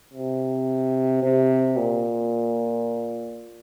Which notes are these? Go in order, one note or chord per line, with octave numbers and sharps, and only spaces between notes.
C3
C3
A#2